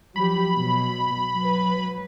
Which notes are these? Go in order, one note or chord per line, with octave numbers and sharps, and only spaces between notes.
F3 F#3 G4 B5
B2 F#3
F#3 B4